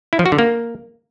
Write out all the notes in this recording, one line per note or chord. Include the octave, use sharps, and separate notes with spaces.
E4
F3
F#4
D3
A#3